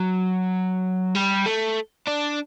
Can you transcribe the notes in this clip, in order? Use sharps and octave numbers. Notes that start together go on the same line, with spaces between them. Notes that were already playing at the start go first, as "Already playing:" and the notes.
Already playing: F#3
G3
A3
D4